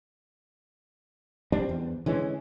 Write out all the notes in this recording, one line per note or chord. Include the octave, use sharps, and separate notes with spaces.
G3 C4 D4
E2
D3 E3 G#3 C#4